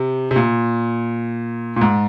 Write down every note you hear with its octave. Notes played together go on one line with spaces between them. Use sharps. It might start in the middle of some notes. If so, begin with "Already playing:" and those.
Already playing: C3
C3
A#2
A#2
G#2